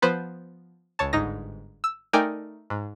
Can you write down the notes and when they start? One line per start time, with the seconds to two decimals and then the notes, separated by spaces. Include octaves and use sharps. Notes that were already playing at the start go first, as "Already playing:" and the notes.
0.02 F3 B3 B4 C5
0.99 C#2 C#5 A5
1.13 G1 G#2 D#4 A#6
1.84 E6
2.13 A3 D#4 A#4 D5 G5 G#5
2.70 G#2